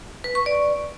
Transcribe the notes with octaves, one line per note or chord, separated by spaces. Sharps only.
B4
C#6
D5